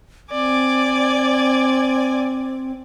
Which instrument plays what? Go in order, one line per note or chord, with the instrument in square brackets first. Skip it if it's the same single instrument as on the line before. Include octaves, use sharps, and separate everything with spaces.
[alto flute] C4 [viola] D5 G#5